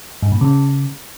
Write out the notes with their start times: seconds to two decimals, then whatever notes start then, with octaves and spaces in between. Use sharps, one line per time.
0.23 G2
0.32 A#2
0.41 C#3